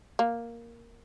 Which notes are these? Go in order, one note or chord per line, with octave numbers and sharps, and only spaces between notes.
A#3